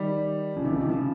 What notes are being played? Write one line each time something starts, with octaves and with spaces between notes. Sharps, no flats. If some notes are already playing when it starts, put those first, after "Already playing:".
Already playing: D#3 G3
C#3 F3
C3 D#3
C#3 F3
C3 D#3
C#3 F3